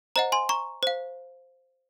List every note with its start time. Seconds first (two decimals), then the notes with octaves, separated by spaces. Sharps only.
0.16 C5 D#5 F#5 A#5
0.32 G#5 C6
0.49 A#5 C#6
0.83 C5 F5